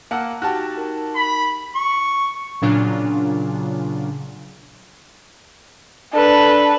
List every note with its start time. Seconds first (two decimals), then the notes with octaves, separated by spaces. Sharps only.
0.11 A#3 F#5 A5 A#5 E6
0.42 D#4 F#4 G4 A5 F6 A#6
0.77 D#4 A#4
1.16 B5
1.75 C#6
2.62 A#2 C#3 F#3 D4 F4
6.14 D4 A4 B4